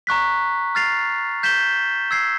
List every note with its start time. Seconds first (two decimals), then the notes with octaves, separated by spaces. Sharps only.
0.07 A#5 C#6 F#6 B6
0.75 F6 A6 C7 F7
1.43 G6 B6 E7 G7
2.11 E6 G#6 C7